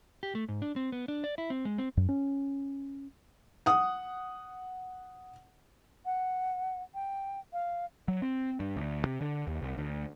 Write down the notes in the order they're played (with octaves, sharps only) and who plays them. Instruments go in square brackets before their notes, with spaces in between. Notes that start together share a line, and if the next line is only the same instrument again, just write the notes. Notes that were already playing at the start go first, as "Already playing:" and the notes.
[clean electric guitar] G4
A3
G#2
D4
C4
B3
D4
D5
E4
C4
G#3
C4
[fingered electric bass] F#2
C#4
[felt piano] F#5 D#6
[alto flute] F#5
G5
F5
[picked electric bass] F#3
C4
G2
D2
C3
D3
D#2
C2
D2